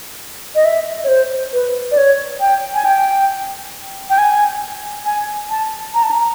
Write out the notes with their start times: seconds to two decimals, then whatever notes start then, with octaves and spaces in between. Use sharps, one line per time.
0.55 D#5
0.65 E5
1.04 C#5
1.08 C5
1.53 B4
1.91 D5
1.97 C#5
2.41 G5
2.75 G#5
2.85 G5
4.10 G5
4.18 G#5
5.05 G#5
5.50 A5
5.94 A#5
6.03 A5
6.11 A#5